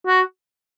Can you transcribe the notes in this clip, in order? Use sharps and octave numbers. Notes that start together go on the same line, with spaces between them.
F#4